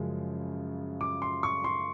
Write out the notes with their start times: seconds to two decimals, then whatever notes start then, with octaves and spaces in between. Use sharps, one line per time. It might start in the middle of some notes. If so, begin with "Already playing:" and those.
Already playing: F#2 C#3 F3 G#3
1.01 D6
1.22 C6
1.43 C#6
1.64 C6